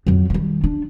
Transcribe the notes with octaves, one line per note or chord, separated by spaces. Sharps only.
F2 F#3
D#3 G3
D4